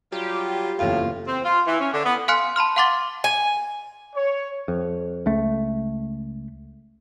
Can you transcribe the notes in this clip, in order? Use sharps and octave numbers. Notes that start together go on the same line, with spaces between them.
F#3 G3 F4 G4
F#1 E2 A2 F4
C4
F4
E3
C#4
D3
B3
F5 G#5 C6 F6 F#6 C#7
A5 B5 C6 F6
F5 F#5 C6 D6 A6 G7
G#5
C#5
F2
C#2 A3